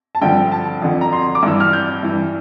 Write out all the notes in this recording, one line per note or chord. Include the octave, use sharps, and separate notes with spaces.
A5
G2 D3 F3 G5
A5
F2 D3 F3
A#5
C6
D6
G2 E3 E6
F6
G6
G2 E3